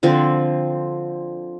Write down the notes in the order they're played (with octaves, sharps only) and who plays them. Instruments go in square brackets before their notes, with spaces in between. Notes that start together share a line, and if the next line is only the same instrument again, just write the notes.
[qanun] D3 F3 C4